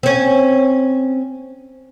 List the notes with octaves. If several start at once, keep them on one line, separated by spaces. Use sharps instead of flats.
C4 C#4